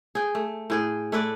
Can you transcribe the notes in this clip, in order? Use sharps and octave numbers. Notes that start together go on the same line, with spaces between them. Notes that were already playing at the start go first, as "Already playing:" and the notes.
G#4 G5
A3
A2 G#4 G5
A3 E4 B4 D5